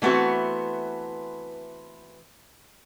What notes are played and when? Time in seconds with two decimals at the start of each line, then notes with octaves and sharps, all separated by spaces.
0.02 E3 A3 B3 C4 F#4